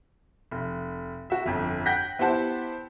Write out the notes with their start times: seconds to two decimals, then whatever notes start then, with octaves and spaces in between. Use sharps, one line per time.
0.51 F1
1.30 F#4 E5
1.46 G1 F2
1.86 F#5 G5 F#6 G6 A#6 B6
2.19 B3 E4 G4 C5 F#5 A5